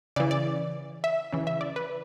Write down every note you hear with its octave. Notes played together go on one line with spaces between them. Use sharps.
C#3 E3 D5
D5
E5
C#3 E3
E5
D5
B4